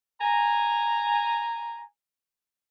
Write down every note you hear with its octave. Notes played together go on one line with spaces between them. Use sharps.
G#5 A#5